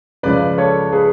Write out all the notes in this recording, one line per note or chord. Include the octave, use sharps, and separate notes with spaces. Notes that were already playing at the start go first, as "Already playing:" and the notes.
C#2 C#3 F3 B4 D5
A4 C#5
G#4 B4